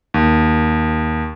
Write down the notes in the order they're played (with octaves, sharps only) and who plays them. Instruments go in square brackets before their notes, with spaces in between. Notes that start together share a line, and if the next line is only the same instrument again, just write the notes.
[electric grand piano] D#2